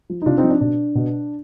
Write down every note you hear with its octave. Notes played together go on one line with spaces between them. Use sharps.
F3
D#4
C3 D4 F4
C4 D#4
F3
D4
B2 D4
B2